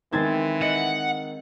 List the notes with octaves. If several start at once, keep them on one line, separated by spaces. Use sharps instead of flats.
D#3 E3 G#3 C4 G#6 A6
D#5 F#5